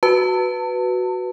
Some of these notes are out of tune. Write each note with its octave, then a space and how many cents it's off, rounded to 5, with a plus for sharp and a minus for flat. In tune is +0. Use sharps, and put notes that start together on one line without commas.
F#4 +0 B4 +0 A5 +35